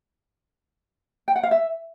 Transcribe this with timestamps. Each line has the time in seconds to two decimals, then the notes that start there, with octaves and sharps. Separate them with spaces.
1.28 G5
1.36 F#5
1.43 F5
1.51 E5